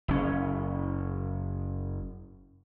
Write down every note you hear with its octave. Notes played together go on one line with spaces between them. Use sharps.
F#1 C#4